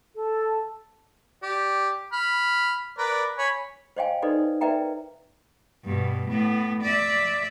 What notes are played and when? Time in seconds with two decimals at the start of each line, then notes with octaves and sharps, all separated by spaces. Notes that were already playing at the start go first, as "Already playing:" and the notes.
0.15 A4
1.43 G4 D5
2.13 B5 F6
2.98 A#4 B4 D5
3.38 C#5 G#5 B5
3.97 C5 C#5 D#5 F5 G5 G#5
4.22 D#4 A4 B4 C5 D5
4.61 A#4 B4 D5 E5 G5 A#5
5.85 G2 B2
6.29 A2 B3
6.83 D5 E5